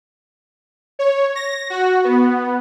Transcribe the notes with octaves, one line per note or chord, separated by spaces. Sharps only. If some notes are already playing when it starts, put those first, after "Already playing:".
C#5
A#6
F#4
B3